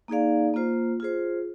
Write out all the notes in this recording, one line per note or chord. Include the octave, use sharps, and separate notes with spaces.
A#3 D#4 G#4 D5 F5
A#3 F4 C5
F4 G#4 C5